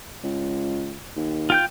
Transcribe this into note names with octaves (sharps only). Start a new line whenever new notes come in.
C#2
D#2
F4 G5 G6